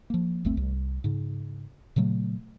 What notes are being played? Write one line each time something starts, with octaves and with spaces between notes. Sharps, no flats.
F3 A#3
G1 D2 A3 C4
C2
G#2 C#3
A#2 C#3 F#3 A3